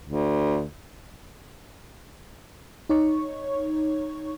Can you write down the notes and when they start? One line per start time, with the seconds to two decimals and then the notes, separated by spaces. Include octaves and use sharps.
0.05 D2
2.89 D#4 C#5 C#6